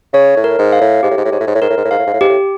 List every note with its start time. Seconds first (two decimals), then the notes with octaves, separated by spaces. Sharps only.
0.13 C#3 C#5
0.37 A2
0.44 A#4
0.59 G#2
0.73 F5
0.81 A2
1.03 G#2 G4
1.11 A2
1.17 G#2
1.25 A2
1.32 G#2 C#5
1.40 A2
1.47 G#2
1.55 A2
1.62 G#2 A#4
1.70 A2
1.77 G#2
1.85 A2
1.91 G#2 F5
1.99 A2
2.06 G#2
2.14 A2
2.21 G#2 G4
2.29 A2